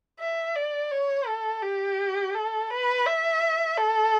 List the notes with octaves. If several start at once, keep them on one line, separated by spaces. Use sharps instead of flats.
E5
D5
C#5
A4
G4
A4
B4
E5
A4